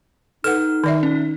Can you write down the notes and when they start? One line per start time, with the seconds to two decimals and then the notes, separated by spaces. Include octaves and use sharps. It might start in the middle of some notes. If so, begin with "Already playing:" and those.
0.44 D#4 A4 B4 F#5 F6
0.84 D#3 D5 E5
1.03 C#4